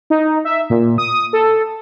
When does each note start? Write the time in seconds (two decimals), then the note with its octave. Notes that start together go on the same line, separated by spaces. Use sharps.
0.10 D#4
0.45 E5
0.70 A#2
0.98 D#6
1.33 A4